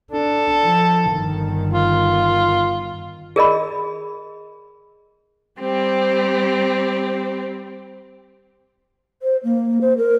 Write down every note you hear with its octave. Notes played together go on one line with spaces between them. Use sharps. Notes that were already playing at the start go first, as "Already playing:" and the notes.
D4 A4
F3
G1 D#3
F4
G#4 A#4 D#5 B5
G3 C4 G4
C5
A#3
C5
A#4